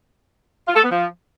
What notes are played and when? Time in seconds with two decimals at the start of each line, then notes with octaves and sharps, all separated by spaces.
0.68 F4
0.76 A4
0.84 B3
0.91 F3